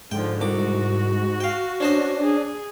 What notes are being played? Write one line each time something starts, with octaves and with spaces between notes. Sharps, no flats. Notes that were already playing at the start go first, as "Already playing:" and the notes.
G#2 D3 F3 G5
C2 F#4 D6
F5 G5
C#4 D4 C5 D#5
G#4